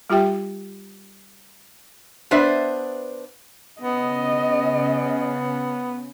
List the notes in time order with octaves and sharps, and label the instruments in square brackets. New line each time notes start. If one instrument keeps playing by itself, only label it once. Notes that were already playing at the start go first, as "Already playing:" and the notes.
[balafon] G3 F4 G4 E5 G5
[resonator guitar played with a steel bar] B3 D4 B4 C5 D5 E5
[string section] C#3 [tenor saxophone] B3 [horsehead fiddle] D#5